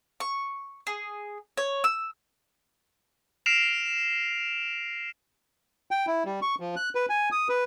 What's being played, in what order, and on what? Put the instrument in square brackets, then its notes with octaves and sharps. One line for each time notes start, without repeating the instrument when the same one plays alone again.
[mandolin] C#6
G#4
C#5
E6
[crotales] F6 A#6 C7 D7 E7 F7
[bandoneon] G5
E4
G3
C#6
F3
F#6
B4
G#5
D#6
B4